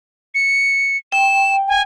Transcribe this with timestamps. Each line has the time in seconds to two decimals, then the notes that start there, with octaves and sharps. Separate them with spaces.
0.35 C#7
1.12 G5 E7
1.68 G#5